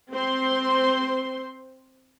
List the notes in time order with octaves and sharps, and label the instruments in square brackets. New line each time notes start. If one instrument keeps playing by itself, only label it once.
[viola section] C4 C5 C6